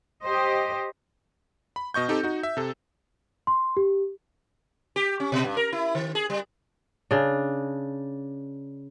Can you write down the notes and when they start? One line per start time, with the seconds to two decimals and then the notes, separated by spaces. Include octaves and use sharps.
0.24 G4 C5 D#5
1.76 B5
1.94 B2 D#5 C#6 G6
2.08 C4 D#4 G4 A4
2.23 D#4 F#4
2.43 E5
2.57 C3 A4
3.47 C6
3.77 G4
4.96 G4
5.20 C#4
5.32 B2
5.44 G2
5.57 A#4
5.72 E4
5.95 D#3
6.15 G#4
6.30 G3
7.11 C#3 D4